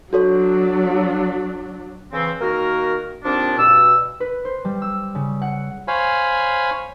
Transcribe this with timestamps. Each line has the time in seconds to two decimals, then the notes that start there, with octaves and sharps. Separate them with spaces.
0.13 F#3 D4 F#4 A4 C#5
2.13 C#3 E3 C4
2.41 D#3 A#3 F#4 A#4
3.24 D#2 F3 C4 D4
3.58 G2 B2 E6
4.20 B4
4.45 C5
4.65 G3
4.82 E6
5.15 C#3
5.42 F#5
5.88 C5 C#5 F5 G#5 B5